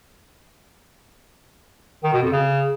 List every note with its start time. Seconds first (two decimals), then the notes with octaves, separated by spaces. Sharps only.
2.04 D#3
2.13 B2
2.23 F2
2.32 C#3